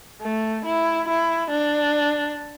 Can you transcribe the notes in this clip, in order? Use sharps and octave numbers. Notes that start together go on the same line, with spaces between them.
A3
E4
E4
D4